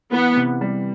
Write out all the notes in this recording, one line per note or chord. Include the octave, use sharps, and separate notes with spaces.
E3 B3
C3
G3